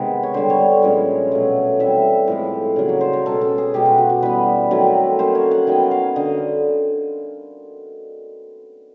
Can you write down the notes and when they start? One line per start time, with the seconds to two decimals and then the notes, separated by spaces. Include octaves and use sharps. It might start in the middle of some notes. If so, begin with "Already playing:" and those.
Already playing: C3 D#3 G#3 B3 B4
0.23 C#5
0.34 D3 G3 B3 C5
0.50 C#5
0.83 A#2 F3 G#3 C#4
1.32 B2 F#3 A3
1.80 E3 G3 C4 E5
2.28 A2 F3 G#3 C4
2.76 C#3 F#3 A#3 D5
2.89 C#5
3.01 C5
3.13 A#4
3.25 B2 G#3 C#4 A4
3.42 A4
3.58 G#4
3.74 B2 G#3 C#4 G4
3.86 F#4
3.98 F#4
4.10 F#4
4.22 E3 G3 B3 B4
4.71 D#3 F#3 A3 C4
5.19 D#3 F#3 A#3 C#4 C5
5.35 C#5
5.51 F#5
5.67 D#3 F#3 B3 G5
5.91 F5
6.16 D3 D#5